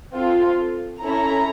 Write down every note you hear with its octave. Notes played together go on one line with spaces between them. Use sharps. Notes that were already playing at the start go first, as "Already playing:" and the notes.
C4 F4 A4
C#4 E4 A4 A#5